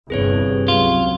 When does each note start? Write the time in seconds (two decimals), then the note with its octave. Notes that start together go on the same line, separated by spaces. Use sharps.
0.10 G1 E2 G2 C3 G#4 B4 C#5
0.68 C#2 F#3 F4